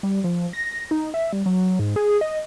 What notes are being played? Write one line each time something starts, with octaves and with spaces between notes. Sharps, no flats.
G3
F3
A#6
D#4
E5
G3
F#3
G#2
G#4
D#5